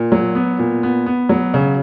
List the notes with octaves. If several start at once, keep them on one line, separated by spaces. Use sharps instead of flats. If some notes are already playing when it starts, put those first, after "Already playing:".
Already playing: A#2
F#3
B3
A#2
B3
B3
F#3
C#3